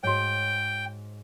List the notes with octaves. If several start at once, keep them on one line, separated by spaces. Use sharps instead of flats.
G#2 F#4 C#5 G5